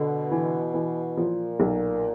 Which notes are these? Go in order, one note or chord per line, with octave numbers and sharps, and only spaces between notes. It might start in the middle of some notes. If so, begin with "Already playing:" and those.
Already playing: B2 D3
E3
E3
A#2 F3
B1